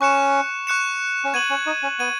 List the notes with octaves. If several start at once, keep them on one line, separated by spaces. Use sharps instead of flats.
C#4 C#6 F#6 C#7 E7
C#6 F#6 C#7 E7
C#4
B3 G#6 D#7 F#7
C#4
D#4
C#4
B3 G#6 D#7 F#7